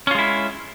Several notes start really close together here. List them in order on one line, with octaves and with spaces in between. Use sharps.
C#4 F4 G#3 E4